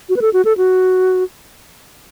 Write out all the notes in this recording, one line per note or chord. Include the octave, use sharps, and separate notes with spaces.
F#4
B4
A4
F#4
A4
F#4